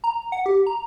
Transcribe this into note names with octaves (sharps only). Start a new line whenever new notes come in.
A#5
F#5
G4
A#5